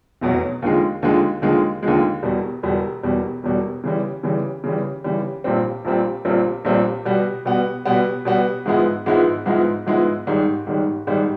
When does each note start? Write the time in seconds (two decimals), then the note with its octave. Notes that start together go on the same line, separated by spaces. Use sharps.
0.21 F1 E2 B2 F#3
0.62 D#2 D3 F3 G#3
1.02 D#2 D3 F3 G#3
1.42 D#2 D3 F3 G#3
1.83 D#2 D3 F3 G#3
2.23 E1 E2 B2 G3
2.63 E1 E2 B2 G3
3.03 E1 E2 B2 G3
3.43 E1 E2 B2 G3
3.84 C#3 E3 G3
4.23 C#3 E3 G3
4.64 C#3 E3 G3
5.04 C#3 E3 G3
5.44 A#1 A#2 G3 C4
5.85 A#1 A#2 G3 C4
6.25 A#1 A#2 G3 C4
6.65 A#1 A#2 G3 C4
7.05 B2 G3 B3
7.45 B2 G3 B3
7.85 B2 G3 B3
8.25 B2 G3 B3
8.66 G#2 F3 G#3 B3 E4
9.06 G#2 F3 G#3 B3 E4
9.46 G#2 F3 G#3 B3 E4
9.86 G#2 F3 G#3 B3 E4
10.27 G#2 D#3 G3
10.67 G#2 D#3 G3
11.07 G#2 D#3 G3